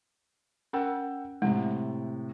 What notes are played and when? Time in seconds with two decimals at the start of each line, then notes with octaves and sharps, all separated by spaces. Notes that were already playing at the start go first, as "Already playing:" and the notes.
0.73 C#4 A#4 F#5 G5 E6
1.42 A2 C3 G#3